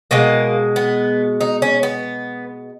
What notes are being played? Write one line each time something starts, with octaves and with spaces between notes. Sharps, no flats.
B2 G#3 A#3
B3
D#4
C#4
B3